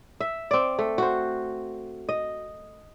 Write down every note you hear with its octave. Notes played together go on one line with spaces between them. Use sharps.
E5
C4 D5
A3
F#4 C5
D#5